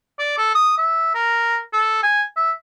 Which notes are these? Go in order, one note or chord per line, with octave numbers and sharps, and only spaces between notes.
D5
A4
D#6
E5
A#4
A4
G#5
E5